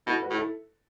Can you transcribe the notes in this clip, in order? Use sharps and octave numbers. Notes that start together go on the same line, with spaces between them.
B2 E4 A4
F#4 B4
A2
E4 A4